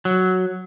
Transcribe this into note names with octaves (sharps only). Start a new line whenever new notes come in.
F#3